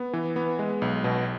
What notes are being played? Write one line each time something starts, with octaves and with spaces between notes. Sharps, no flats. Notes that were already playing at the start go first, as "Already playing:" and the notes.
Already playing: B3
E3
B3
G#3
B1
B2